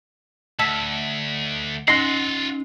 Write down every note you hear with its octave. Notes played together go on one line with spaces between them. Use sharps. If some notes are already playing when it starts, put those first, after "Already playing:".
D2 D#5 F#5 A5 E6 B6
C#4 D#4 F4 D#5 F#5 C6 C7